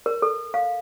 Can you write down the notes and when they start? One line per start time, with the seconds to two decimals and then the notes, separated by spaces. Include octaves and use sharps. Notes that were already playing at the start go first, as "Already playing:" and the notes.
0.06 A#4
0.22 A4
0.54 F5